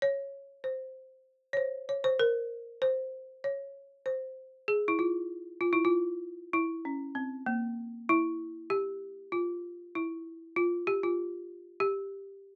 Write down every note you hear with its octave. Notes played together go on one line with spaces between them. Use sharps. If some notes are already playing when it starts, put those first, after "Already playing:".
C#5
C5
C#5
C5
C#5
C5
A#4
C5
C#5
C5
G#4
E4
F4
F4
E4
F4
E4
C#4
C4
A#3
E4
G4
F4
E4
F4
G4
F4
G4